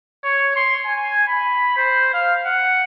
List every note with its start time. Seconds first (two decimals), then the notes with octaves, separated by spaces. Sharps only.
0.24 C#5
0.56 C6
0.86 G#5
1.28 B5
1.77 C5
2.14 F5
2.45 F#5